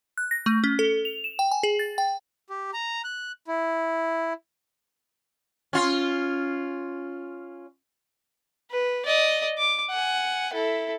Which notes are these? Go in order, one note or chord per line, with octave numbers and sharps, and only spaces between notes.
F#6
A#6
A3
C#4
A4
F7
E7
G5
G#5
G#4
A6
G5
G4
A#5
F#6
E4
C#4 F4
B4
D5 D#5
D6
F#5 G#5
E4 A4